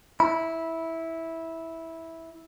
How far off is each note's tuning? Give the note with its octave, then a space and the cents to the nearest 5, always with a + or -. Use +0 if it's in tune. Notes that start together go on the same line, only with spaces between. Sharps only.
E4 -10 B5 -10